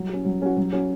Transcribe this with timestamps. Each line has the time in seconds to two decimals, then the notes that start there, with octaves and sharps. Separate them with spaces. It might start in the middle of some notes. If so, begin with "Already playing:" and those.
Already playing: F#3
0.09 C#4 F#4
0.25 F#3
0.42 C#4 F#4
0.57 F#3
0.73 C#4 F#4